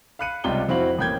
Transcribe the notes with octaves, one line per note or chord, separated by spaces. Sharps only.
F5 B5 F#6 C#7 D#7
C#2 C3 G3 F4 G5 G7
F2 C4 E4 F#4 F5 F#7
A1 A#3 G5 G6 G#6